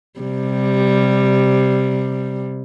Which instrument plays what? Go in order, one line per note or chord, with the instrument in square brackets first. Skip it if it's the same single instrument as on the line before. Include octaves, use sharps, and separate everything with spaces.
[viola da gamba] C3 G3